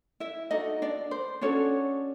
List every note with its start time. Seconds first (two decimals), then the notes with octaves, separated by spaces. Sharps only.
0.20 E4 E5
0.51 D4 D#4 F#4 A4 D#5
0.82 D4 D5
1.11 C5
1.41 C#4 D4 F#4 A4 C#5